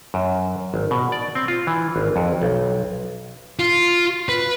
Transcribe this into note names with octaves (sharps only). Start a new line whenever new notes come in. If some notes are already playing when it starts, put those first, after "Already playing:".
F#2
G#1
B2
D5
C4
F4
E3
G#1
F2
B1
F4
B4